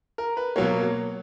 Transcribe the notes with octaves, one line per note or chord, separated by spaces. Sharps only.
A#4
B4
B2 F#3 A#3 C#5